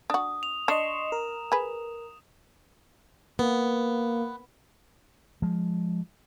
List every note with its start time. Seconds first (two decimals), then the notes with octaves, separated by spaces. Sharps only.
0.10 D4 F#4 D#6
0.43 F7
0.68 D4 D#5 C6 C#6 E7
1.12 A#4
1.52 G#4 B4
3.39 A#3 B3
5.42 F3 G#3